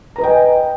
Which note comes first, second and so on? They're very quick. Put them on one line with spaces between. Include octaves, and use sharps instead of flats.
A#5 B4 D#5 G5 G#5